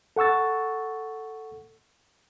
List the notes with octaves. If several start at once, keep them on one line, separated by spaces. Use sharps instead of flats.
A4 F#5 C#6 E6 A6